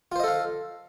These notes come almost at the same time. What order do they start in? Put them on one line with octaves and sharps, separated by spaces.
F4 C5 D#5 A4 F5